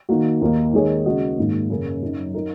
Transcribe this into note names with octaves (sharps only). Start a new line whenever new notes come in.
D#3 A#3 F#4
D#2 D#3 A#3
D#3 G#3 D#4 G#4 C#5
C#3 G#3 F#4 D#5
G#2 D#3 A#3
F#2 C#3 F#3 C#4 A#4
F#2 F#3 D#4
F#3 D#4 A#4